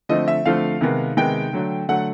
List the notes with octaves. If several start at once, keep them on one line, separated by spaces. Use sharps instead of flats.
D3 F3 A3 C4 D#5
E5
D3 F3 A3 C4 F5
C3 D#3 G#3 B3
C3 D#3 G#3 B3 G5
D3 F#3 A3
D3 F#3 A3 F#5